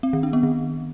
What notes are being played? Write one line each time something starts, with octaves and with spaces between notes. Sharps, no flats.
C4
D#3
D4
B3
D#3